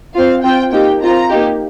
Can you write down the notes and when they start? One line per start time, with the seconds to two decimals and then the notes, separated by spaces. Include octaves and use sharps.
0.14 C4 F4 F5
0.42 C4 F4 G5
0.71 A#3 D#4 G4 G5
1.01 C4 F4 A#5
1.29 A#3 D#4 G4